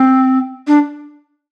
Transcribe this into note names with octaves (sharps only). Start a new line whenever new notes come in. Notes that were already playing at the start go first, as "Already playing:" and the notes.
Already playing: C4
D4